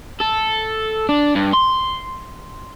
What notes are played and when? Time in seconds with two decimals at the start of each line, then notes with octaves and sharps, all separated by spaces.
0.20 A4
1.09 D4
1.36 G2
1.54 C6